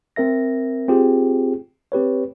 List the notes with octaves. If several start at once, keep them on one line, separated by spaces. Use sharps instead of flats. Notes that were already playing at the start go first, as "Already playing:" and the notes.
C4 A#4 E5 A#6
C4 F4 G4 G#4
C4 G4 B4 C#5